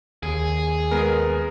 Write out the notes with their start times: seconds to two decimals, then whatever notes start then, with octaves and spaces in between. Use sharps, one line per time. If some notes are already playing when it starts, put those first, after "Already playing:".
0.23 D#2 G#4
0.91 G#3 B3 A#4